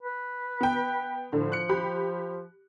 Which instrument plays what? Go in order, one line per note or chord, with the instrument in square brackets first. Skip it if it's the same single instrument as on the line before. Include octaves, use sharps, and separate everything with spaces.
[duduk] B4
[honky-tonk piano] B3 G5
[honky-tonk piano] A2 D3 [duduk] F3
[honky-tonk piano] F#6 C#7
G4 B5